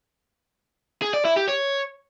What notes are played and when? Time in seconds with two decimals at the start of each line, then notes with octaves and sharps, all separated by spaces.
1.02 G#4
1.13 D5
1.25 E4
1.36 G4
1.48 C#5